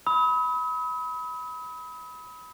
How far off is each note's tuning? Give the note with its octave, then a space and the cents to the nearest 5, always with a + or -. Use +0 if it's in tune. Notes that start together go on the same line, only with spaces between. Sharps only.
B5 +0 D#6 +45